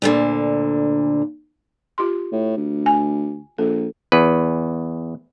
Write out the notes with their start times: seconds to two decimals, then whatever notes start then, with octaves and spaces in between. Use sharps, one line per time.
0.02 D2 A#2 D3
1.98 F4 G4 C6
2.32 A2
2.57 D2
2.86 G#5
3.58 A#1 A4
4.12 E2 B4